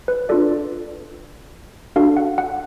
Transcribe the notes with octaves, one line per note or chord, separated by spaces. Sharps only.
B4
D4 F4 A4 D5
D4 F#4 A4 F5
F#5
F#5